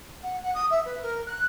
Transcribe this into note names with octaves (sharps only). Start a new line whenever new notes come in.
F#5
F#5
D#6
E5
B4
A#4
F#6